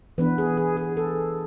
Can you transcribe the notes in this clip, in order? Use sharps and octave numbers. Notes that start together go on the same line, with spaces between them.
E3 B3 D4 B4
G#4
G#4
G#4
A4